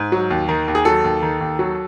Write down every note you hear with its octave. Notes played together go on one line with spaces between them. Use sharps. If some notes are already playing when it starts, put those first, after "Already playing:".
Already playing: G#2
F#3
D#2
D#3
D#2
G#4
F#3 A4
D#2
D#3
D#2
F#3